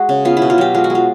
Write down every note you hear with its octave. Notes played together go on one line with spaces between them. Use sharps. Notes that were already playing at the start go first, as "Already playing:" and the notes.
Already playing: G#3 F#4
C#3
B3 F4
E4
B2
F4
F#3 G4
G#3 F4
F#4
G#3
F4